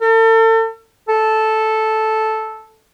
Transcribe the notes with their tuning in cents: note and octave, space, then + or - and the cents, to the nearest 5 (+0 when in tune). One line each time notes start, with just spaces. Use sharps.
A4 +40
A4 -5